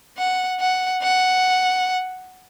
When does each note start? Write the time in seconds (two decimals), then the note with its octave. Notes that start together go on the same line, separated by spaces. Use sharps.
0.17 F#5
0.60 F#5
1.02 F#5